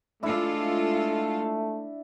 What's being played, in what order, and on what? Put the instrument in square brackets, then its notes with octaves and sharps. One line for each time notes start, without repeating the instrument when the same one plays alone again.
[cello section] G#3 F4 A4 [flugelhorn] A3 [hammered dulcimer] D4 E4